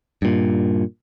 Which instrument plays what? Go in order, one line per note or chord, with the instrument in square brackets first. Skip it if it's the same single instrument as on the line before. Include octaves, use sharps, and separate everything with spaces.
[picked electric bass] G2 A#2